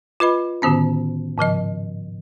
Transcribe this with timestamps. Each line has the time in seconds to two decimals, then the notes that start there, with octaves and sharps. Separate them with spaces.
0.20 F4 B4 D#5 B5
0.62 A2 D3 D#3 B3 C#4
1.38 G#2 C#3 F3 D#5